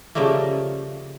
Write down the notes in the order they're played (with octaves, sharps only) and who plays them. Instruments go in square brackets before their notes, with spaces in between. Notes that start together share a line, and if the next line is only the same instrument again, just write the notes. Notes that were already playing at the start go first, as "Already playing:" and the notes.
[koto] C#3 F3 G3 A3 A#3